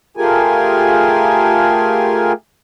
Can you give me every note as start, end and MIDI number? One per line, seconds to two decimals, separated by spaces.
0.17 2.33 57
0.17 2.33 65
0.17 2.33 67
0.17 2.33 68
0.17 2.33 70
0.17 2.33 80